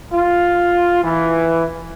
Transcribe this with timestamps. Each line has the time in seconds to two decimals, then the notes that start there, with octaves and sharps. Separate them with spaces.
0.12 F4
1.01 E3